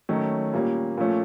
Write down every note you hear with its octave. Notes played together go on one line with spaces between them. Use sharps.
D#3 F#3 A3 C#4
A#2 G3 A#3 C#4
A#2 F3 A3 C#4